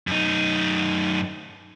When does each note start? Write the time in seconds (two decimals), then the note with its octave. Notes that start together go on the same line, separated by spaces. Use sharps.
0.07 F#2 D#4